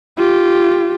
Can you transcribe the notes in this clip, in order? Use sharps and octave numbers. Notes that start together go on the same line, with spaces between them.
F4 G4